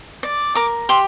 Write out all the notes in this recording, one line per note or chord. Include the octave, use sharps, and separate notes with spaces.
D5
A#4 D6
G4 C6